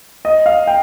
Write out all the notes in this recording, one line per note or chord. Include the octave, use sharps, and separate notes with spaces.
D#5
F5
G5